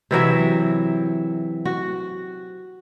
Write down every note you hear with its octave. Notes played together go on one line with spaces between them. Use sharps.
C3 E3 F#3 E5
F#4